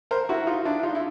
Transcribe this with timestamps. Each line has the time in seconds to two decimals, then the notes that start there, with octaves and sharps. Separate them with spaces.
0.11 A#4 C5
0.29 E4 F#4
0.47 D#4 F4
0.65 D4 E4
0.83 D#4 F4
0.95 E4